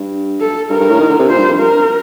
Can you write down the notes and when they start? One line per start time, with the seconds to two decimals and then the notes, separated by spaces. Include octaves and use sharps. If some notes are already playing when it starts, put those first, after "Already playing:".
Already playing: G2
0.41 A4
0.70 G2 A#4
0.80 G2
0.90 A2
0.99 D#3
1.09 D3
1.19 C3
1.29 A#2 C5
1.38 G2
1.49 F2
1.58 G2 A#4